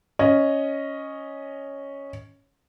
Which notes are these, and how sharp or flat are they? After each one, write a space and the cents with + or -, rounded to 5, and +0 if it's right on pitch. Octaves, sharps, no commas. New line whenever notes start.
C#4 +0 D#5 +0